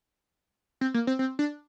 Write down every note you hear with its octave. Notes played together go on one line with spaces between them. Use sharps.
C4
A#3
C4
C4
D4